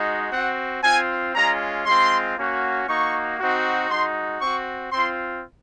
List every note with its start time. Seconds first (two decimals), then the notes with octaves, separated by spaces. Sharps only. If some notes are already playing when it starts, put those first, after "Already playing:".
Already playing: G#3 D#4 F#4
0.32 C4 F#4 F#5
0.83 C4 F4 G#5
1.34 G#3 C#4 F4 A#5
1.86 G#3 C4 F4 C6
2.37 A#3 C#4 F#4
2.88 A#3 D#4 F#4 C#6
3.39 C4 D#4 F#4
3.90 G#3 D#4 F#4 C6
4.41 C4 F#4 C#6
4.92 C4 F4 C6